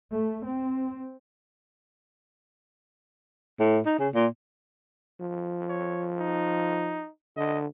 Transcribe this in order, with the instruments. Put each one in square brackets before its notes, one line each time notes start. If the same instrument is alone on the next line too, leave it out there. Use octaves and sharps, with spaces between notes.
[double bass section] A3
C4
[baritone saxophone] A2
D#4
C#3
A#2
[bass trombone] F3
[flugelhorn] C#5
D#4
[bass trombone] D3 [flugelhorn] D#5